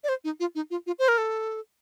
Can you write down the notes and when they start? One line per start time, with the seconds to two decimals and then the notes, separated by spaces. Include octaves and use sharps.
0.04 D5
0.09 C5
0.24 D#4
0.40 F4
0.55 D#4
0.70 F4
0.87 F4
0.99 C5
1.08 A#4
1.18 A4